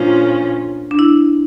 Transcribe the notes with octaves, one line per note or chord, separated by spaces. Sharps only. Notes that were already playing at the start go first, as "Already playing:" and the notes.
Already playing: A#2 F3 C#4 D4 F4
D4
E4